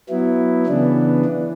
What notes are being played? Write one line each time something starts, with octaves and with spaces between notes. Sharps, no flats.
F#3 B3 E4
C#3 E3 B3 D4
E3